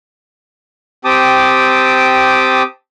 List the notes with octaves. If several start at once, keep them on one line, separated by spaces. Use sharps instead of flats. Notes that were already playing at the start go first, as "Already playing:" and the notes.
C4 G4 G5 A5 D6 D#6